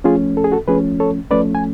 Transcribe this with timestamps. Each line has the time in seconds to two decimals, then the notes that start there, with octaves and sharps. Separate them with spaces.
0.04 F3 A3 C#4 F4 G#4
0.37 A4
0.44 G#4
0.52 F#4 A4
0.68 F3 A3 C#4 G#4 B4
1.00 A4 C#5
1.31 F3 A3 C#4 B4 D5
1.55 G#5